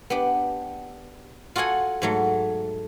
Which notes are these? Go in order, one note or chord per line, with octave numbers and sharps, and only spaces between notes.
B3 D4 G4
F4 F#4 A4 F#5 G#5
G#2 F#3 A3